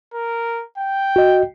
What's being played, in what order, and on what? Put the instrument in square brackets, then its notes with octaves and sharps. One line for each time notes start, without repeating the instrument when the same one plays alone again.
[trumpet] A#4
G5
[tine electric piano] F#4 D#5